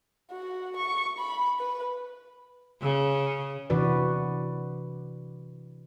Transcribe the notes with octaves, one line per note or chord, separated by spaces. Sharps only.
F#4
C#6
B5
B4
C#3
C3 E3 D4 F#4 B4 D5